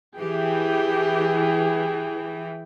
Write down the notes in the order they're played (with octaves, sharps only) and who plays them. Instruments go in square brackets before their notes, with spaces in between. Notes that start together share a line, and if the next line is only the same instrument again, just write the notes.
[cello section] E3 [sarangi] G4 [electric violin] G#4 G5